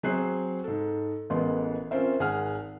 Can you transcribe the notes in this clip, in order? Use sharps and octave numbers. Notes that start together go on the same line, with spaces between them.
F#3 C4 G#4 C5 F#6 C7
G#2 A4
A1 G#3 B3 A#4 C6
C4 C#4 F4 A#4 C5 E5
G#1 G#4 F#5 F6